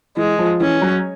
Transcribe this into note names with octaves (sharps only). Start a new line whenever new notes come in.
E3 G#3
F3
E3 C#4
F#3